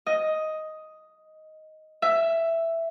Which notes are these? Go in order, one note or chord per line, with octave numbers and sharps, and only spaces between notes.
D#5
E5